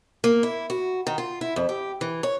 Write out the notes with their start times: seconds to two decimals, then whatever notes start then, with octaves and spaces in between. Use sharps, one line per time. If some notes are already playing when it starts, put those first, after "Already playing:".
0.24 A#3
0.43 E4
0.70 F#4
1.07 D#3
1.18 F4
1.41 E4
1.56 F2
1.69 G4
2.01 E3
2.23 C#5